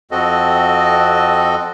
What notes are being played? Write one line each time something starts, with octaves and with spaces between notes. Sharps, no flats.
F2 C4 F#4 A4 D#5